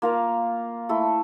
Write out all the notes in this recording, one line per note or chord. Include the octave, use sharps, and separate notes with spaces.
A#3 F4 A#4 F5
A3 E4 A4